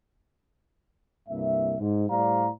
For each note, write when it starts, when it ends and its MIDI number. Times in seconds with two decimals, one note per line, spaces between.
1.29 1.75 36
1.29 1.75 43
1.29 1.75 58
1.29 1.75 76
1.79 2.05 44
2.10 2.48 45
2.10 2.48 55
2.10 2.48 72
2.10 2.48 74
2.10 2.48 77
2.10 2.48 82